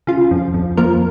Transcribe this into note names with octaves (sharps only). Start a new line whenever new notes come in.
C#3 F4
F2
F2
F3 A#3 A#4